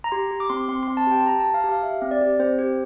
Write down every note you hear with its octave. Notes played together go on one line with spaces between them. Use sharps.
A#5
G4 C6
G4
D6
C4 C6
D6
C4 C6
C4 C6
A5
G4 G5
A5
G4 A#5
A5
G4
F5
G4
F5
G4 E5
C4
D5
G4
C4 C5
G4